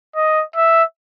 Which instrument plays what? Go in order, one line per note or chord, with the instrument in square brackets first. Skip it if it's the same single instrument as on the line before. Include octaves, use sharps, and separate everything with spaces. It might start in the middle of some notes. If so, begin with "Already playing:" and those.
[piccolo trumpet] D#5
E5